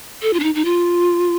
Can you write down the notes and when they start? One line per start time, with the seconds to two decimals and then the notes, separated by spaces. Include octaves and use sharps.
0.22 A4
0.33 F4
0.40 D4
0.43 D#4
0.55 D#4
0.65 F4